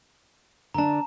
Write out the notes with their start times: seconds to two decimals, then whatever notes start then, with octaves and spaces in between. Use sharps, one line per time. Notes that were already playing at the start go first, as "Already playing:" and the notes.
0.74 D3 D4 A5 A#5